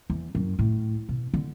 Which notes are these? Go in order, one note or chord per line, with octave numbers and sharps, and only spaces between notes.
E2
F#2
A2
B2
D3